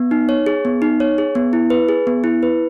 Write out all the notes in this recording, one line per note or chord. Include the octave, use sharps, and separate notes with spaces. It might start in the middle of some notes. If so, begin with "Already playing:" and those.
Already playing: B3
D#4
C#5
G#4
B3
D#4
C#5
G#4
B3
E4
B4
G#4
B3
E4
B4